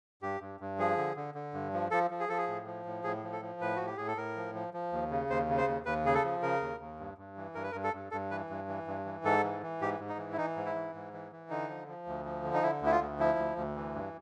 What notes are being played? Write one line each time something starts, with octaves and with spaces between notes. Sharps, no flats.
G2 G4
G2
G2
F3 G#4
D3
D3
D3
G2
F3
F3 A4
F3
G#4
F3 A4
G#4
A2
F3
A2
A2 G#4
F3
A4
F3
A2 B4
A2 F#4
G4
A2 G#4
A4
A2 A#4
F3
F3
F3
D#2
C#3
D#2 C5
C#3
C5
D#2
D#2 B4
C#3 G#4
A4
F3
C#3 A#4
D#2
D#2
G2
G2
E3
G2 A#4
B4
G2 A#4
A4
G2
G2 A4
E3 B4
G2
E3
G2
E3
G#2 A4
E3
E3
G#2 G4
G#2
D#4
E3
E4
E3 D#4
G#2
E4
E3
G#2
E3
E3
D3 D#4
F3
F3
D2
F3
D3
D#4
D3 E4
D2 E4
F4
D2
F3 E4
D2
D2
E3
G2